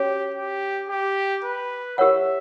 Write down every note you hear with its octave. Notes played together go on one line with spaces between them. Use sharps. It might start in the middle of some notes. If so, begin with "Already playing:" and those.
Already playing: C#4 F#4 G4 C#5
G4
G4
B4
G4 A#4 C#5 E5 F#5